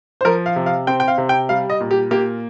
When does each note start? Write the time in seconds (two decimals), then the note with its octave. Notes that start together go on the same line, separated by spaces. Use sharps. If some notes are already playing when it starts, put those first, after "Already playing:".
0.21 C5
0.25 F3 A#4
0.46 F5
0.56 C3
0.66 F5
0.87 C4 G5
1.00 G5
1.08 F5
1.18 C3
1.29 G5
1.49 G3 F5
1.70 D#5
1.80 A#2
1.91 G4
2.11 A#3 G4